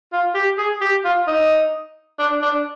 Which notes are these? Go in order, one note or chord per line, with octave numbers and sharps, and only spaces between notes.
F4
G4
G#4
G4
F4
D#4
D4
D4